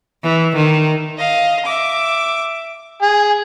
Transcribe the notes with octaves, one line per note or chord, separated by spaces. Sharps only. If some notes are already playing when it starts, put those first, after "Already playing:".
E3
D#3
D#5 F5
E5 D6
G#4